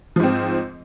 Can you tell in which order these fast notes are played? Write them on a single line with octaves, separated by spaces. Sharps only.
F3 G#2 C4